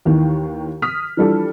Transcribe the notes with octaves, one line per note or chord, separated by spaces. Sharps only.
D#2 D#3 E3
D#6 F6 B6
E3 F3 G3 D4 A4